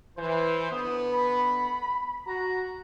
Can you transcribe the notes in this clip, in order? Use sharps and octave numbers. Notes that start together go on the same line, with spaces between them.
E3 C5
D3 B3 D#6
B5
F#4 A#5